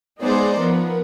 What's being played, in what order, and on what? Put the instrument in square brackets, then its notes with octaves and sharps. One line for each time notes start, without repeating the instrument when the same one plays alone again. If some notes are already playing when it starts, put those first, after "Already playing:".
[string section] G#3 B3 D#4 G#4 C5 D5
F3 B3 A#4